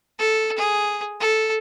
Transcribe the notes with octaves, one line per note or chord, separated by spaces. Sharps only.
A4
G#4
A4